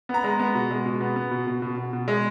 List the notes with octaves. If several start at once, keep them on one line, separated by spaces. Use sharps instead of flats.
B3
A#5
G#3
B3
B2
G#3
B2
B3
B3
B2
B2
B2
B2
B2
G#3